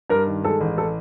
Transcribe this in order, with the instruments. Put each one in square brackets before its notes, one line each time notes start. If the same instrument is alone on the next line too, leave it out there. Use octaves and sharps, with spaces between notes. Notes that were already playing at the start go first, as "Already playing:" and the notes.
[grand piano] G2 [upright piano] A#4
[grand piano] D#3
[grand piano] G#3 [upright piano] A4
[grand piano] A1
[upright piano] A4